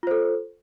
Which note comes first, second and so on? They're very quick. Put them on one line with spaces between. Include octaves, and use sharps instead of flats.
F4 C5 A4